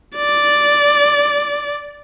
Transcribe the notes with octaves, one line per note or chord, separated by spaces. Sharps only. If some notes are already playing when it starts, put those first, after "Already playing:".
D5